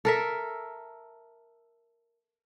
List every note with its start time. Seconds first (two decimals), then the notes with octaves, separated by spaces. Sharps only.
0.05 A4 A#4 E5